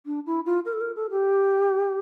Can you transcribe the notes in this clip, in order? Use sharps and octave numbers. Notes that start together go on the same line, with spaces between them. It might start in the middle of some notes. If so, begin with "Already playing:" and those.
D4
E4
F4
A#4
A4
A#4
A4
G4